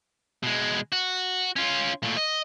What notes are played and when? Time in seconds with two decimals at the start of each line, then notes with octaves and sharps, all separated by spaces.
0.43 B2 G#3
0.92 F#4
1.56 C#4 F4
2.03 A#2 A3
2.17 D#5